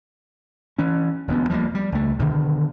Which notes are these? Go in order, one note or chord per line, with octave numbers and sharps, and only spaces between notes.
E3 C#4
E1 D2 B3
F3 G3 G#3 A#3
G3
C#2 A3
B2 D3 D#3